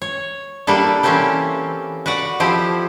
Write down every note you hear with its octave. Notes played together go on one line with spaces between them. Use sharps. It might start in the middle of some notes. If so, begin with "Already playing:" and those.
C#5
G3 A#3 D4 E4 A4
E3 A#3 C4 C#4 G4 A4
F#4 B4 D5 F#5
F3 C4 E4 G4 A4